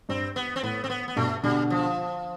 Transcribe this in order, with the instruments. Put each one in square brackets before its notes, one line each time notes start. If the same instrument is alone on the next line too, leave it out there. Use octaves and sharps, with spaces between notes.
[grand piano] G2 [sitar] C4
[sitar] B3
C4
[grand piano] A2 [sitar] B3
[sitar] C4
B3
B3
[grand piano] G2 B2 [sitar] A3
[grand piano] B2 D3 [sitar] G3
[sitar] F3